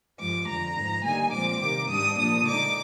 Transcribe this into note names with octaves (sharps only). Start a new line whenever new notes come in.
G2 F3 G#3 D6
F2 D3 F3 A#5
G#2 F3 G#3
D3 G3 A#3 D#4 G#5
A#2 F3 G#3 C4 D6
C3 D#3 G3 A#3 D6
G#2 G3 D4 D#6
A#2 F3 A#3 D4 D#6
D3 G#3 D#4 D6